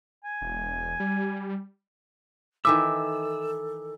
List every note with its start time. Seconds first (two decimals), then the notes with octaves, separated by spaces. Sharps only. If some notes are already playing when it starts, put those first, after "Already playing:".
0.25 G#5
0.42 E1
1.00 G3
2.65 D#3 E3 A4 E5 D6 E6